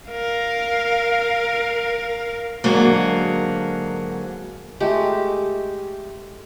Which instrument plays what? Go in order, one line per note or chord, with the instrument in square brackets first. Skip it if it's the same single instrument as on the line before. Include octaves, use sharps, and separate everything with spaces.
[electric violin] A#4 F5
[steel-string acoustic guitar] G#2 D3 F#3 A#3
[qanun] G#3 A3 G4